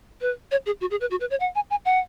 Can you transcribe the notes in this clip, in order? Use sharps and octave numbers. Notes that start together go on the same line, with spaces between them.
B4
C#5
G#4
F#4
G#4
B4
F#4
B4
C#5
F#5
G#5
G#5
F#5